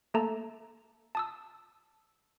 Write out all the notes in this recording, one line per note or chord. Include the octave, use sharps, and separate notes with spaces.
A3 A#3 A4 A5 A#5
A5 D#6 E6